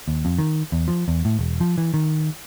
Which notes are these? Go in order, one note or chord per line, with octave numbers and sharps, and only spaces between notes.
D#2
F2
D#3
E2
F3
E2
A2
E1
F3
E3
D#3